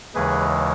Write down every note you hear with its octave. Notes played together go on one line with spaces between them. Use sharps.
D#2 C#3 E3 G#3 G#4 B4